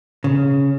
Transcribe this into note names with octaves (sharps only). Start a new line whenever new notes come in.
C#3